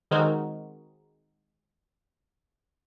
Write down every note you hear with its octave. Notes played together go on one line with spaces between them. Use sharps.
D#3 G#3 C4 D#4 F#4 A#4